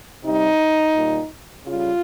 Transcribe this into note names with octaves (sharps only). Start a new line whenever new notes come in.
C3 G3 D#4
A#2 G3
C#3 G3 F4